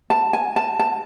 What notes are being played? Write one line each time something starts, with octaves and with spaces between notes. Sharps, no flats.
A5
G#5
A5
A5